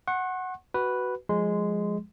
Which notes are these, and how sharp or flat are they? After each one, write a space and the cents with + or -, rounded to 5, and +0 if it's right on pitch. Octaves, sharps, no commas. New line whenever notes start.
F#5 +0 C#6 -45
F#4 +15 B4 +0
F3 +25 G#3 +0 C6 -20